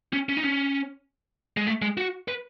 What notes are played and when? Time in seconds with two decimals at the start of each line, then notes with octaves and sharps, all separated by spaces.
0.13 C#4
0.29 C#4
0.37 D#4
0.44 C#4
1.57 G#3
1.67 A3
1.82 G#3
1.97 F#4
2.28 B4